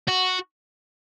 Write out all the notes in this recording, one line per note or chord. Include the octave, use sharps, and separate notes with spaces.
F#4